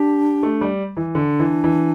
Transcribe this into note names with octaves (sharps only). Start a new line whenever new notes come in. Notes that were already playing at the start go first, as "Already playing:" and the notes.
Already playing: D4 G4
A3
G3
E3
D3 D4
E3
E3